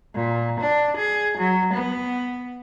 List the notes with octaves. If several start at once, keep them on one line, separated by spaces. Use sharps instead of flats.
A#2
D4
G#4
F#3
B3